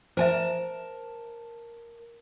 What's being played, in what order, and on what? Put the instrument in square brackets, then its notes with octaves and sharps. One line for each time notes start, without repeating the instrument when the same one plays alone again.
[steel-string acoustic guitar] A#4 G#5 A5 [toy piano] C5 E5